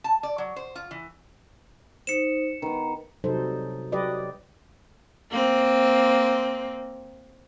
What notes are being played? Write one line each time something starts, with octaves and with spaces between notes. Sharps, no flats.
A5
D5
F#3
C5
F4
E3
D#4 C5 C#7 E7
D#3 B3 B4
C3 F#3 G3 D#4 A4 C5
F#3 G4 B4 D5 D#5
A#3 C4